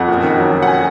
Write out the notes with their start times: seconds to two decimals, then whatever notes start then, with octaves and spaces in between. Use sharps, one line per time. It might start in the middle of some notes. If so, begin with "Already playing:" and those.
Already playing: F2 F#5
0.09 F#1
0.23 D#3
0.38 F#3
0.53 F#3
0.62 F#5
0.67 G#5